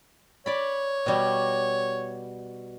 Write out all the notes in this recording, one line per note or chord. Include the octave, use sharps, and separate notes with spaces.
C#5 D5 B5
B2 G3 F#4